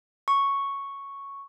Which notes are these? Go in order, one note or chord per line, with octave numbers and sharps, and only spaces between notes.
C#6